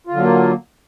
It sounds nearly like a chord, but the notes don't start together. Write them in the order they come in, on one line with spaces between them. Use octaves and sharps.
F4 D3 F#3 A#3